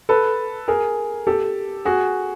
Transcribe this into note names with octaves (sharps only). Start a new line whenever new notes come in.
A4 B4
G#4 A#4
G4 A4
F#4 G#4